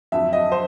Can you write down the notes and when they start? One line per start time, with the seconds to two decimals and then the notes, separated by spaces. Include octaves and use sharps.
0.12 F2 D3 F#3 E5
0.33 D#5
0.52 C5